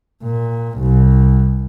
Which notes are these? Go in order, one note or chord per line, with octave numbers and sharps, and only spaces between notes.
A#2
C2